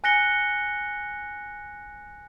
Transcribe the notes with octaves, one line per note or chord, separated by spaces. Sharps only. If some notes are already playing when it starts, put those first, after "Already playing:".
G#5 F#6 A#6 C#7 G7